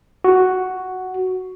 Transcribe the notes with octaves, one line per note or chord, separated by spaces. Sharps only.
F#4